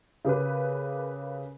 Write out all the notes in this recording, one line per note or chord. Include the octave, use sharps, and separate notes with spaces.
C#3 G4 A#4 B4